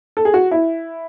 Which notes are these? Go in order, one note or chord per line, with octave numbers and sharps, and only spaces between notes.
A4
G#4
F#4
E4